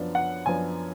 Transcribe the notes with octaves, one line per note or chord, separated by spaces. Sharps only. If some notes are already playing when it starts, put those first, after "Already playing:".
Already playing: F#2 F3 B3 D4
F#5
F#2 F3 B3 D4 G#5